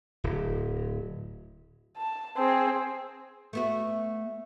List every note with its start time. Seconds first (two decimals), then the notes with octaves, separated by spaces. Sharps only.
0.24 D1
1.97 A5
2.37 C4 G#4
3.53 A3 B3 F#4